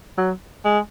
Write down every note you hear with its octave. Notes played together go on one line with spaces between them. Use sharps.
F#3
G#3